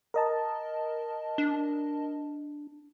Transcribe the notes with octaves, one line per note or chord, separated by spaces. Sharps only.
A#4 D#5 A5
D4